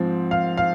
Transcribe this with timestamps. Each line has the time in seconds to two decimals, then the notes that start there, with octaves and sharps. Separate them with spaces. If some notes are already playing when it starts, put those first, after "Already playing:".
Already playing: G#2 F3 C4
0.31 F5
0.57 F5